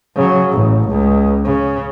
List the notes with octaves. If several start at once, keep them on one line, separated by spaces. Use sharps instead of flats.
C#3 F#3
A1
C#2
C#3